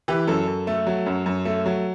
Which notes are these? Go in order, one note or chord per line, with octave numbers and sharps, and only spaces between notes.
E3 G4 B4
F#2 A4
F#2
A3
F#3
F#2
F#2
A3
F#3